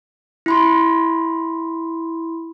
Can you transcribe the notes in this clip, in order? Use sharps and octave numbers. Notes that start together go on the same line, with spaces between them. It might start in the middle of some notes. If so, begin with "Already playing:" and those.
E4 B5 C6